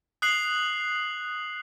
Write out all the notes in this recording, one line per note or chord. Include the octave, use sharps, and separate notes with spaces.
D#6 F#6 C7 F#7